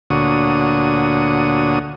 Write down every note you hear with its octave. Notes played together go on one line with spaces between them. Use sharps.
D2 A#2 D3 F#4 C#5 D#6